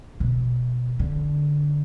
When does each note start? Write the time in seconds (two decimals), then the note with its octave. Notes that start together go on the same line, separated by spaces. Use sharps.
0.20 B2
0.99 D3